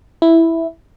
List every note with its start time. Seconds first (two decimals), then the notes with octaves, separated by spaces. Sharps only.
0.22 E4